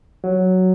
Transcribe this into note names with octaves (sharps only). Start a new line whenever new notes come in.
F#3